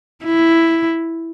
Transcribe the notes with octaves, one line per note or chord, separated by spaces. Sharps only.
E4